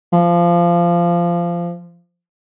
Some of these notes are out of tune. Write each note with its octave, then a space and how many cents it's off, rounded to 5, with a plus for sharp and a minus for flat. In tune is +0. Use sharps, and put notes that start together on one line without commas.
F3 -20